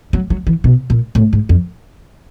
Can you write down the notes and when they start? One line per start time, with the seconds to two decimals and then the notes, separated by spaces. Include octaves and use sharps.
0.13 F#3
0.30 F#3
0.47 E3
0.64 B2
0.90 A#2
1.15 A2
1.33 G#2
1.49 F2